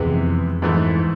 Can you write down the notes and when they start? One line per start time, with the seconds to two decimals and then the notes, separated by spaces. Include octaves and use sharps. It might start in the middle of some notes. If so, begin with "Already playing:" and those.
Already playing: F2 C3 E3 G#3 B3
0.62 G#2 E3 A3